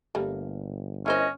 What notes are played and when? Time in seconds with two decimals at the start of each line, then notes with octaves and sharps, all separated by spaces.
0.15 G1 G3 A3 A#3
1.06 C#4 E4 A#4 C5 D#5